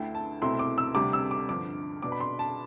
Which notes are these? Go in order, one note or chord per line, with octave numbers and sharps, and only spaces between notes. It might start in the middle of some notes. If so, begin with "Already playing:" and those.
Already playing: D2 D3 A3 E4 G5
A5
C2 B2 A3 C4 E4 C6
D6
E6
D2 C3 G3 D6
E6
D6
G2 D3 F3 D6
B2 B3 D4 D6
B5
C6
A5